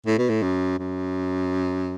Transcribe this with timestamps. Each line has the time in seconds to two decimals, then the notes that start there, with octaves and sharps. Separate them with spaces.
0.06 A2
0.18 B2
0.29 A2
0.43 F#2
0.79 F#2